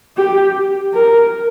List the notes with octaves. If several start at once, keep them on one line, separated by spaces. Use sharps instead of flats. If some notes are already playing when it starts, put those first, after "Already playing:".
G4
A#4